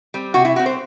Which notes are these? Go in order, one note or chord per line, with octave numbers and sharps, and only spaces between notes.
G3 C4
C3 F#4
E4
G3 C4 F#4
C5